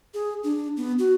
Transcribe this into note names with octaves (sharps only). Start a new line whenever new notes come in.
G#4
D4
B3
F#4